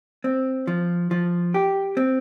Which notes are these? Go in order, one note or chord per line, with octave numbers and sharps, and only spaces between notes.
C4
F3
F3
G4
C4